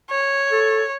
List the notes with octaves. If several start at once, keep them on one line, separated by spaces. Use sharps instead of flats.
C#5
A4